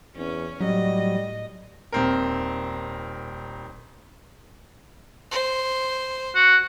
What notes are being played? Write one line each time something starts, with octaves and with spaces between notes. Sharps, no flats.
E2 C#4
A2 F#3 G3 D#5
D#1 C4 A#4
C5
F#4